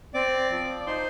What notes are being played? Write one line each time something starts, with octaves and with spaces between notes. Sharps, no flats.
C4 D5 D6
F3
D#4 C5 C6